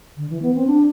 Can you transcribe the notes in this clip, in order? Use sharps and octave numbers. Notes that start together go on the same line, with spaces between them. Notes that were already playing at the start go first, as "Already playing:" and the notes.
D3
E3
B3
C4
D4